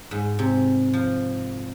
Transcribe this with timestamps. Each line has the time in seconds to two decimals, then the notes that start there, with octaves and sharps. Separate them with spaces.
0.11 G#2
0.39 C3
0.93 F3